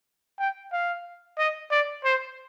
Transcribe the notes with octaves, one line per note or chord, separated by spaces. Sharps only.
G5
F5
D#5
D5
C5